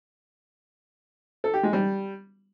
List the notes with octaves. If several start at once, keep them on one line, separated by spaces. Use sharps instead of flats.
A4
G4
G#3
G3